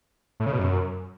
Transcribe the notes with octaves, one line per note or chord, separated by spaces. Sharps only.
A2
C#3
B2
F#2